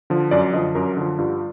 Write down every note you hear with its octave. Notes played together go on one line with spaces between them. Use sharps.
D3 F3
F#2 D5
D3 F3 D#5
F#2 A#4
D3 F3
G2 F4